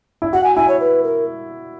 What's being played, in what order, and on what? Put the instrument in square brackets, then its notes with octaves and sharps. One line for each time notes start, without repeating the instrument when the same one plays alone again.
[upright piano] E4
[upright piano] F#4 [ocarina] F#5
[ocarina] G#5
[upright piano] E4 [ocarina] G#5
[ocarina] C#5
B4
A#4